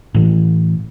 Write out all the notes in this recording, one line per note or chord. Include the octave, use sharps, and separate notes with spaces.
A2 E3